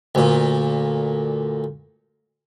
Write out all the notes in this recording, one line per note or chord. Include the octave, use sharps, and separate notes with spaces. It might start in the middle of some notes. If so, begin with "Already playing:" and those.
D2 A#2